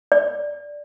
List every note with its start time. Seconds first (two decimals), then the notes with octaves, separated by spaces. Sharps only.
0.12 D5